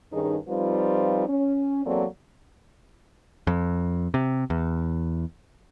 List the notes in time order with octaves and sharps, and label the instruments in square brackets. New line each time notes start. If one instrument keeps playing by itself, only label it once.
[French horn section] G2 D#3 C#4 D#4 G#4
F3 G3 C4 D#4 F4 B4
C#4
E2 F#3 A#3 C4 A4 D5
[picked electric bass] F2
C3
E2